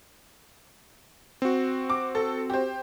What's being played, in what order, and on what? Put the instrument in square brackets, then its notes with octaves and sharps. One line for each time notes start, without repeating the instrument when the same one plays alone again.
[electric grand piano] C4 F#4
[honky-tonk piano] D6
A4
G4 C5